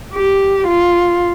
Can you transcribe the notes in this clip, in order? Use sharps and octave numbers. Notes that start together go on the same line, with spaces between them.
G4
F4